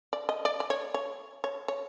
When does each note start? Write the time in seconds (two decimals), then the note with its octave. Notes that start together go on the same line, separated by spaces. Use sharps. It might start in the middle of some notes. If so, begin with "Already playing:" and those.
0.13 D5
0.29 D#5
0.45 D5
0.60 D5
0.70 C#5
0.94 C#5
1.44 C#5
1.68 C#5